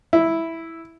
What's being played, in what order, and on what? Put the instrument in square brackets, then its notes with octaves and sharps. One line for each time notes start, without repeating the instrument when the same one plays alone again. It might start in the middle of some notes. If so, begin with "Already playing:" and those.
[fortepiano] E4